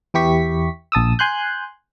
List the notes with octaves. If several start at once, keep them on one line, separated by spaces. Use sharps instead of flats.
E2 E3 E4 G4 C#6 B6
A#1 A5 D#6 E6
G#5 C6 F#6 G6